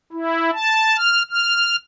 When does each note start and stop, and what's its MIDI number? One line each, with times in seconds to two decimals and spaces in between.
0.13 0.50 64
0.53 0.97 81
0.97 1.23 89
1.31 1.76 89